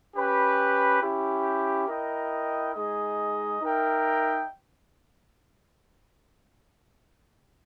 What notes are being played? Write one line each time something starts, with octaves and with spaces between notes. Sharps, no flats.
C#4 G4 B4
C#4 E4 G4
E4 A#4 D#5 G5
G#3 D#4 G#4 D#5
D#4 A#4 E5 G5